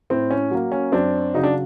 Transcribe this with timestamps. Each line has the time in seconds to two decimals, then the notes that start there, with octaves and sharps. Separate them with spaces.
0.10 A2 C4
0.31 C#4
0.51 F#3 A#3
0.72 C#4
0.92 F#2 C4 D4
1.34 C#3 F#3 D#4
1.43 D4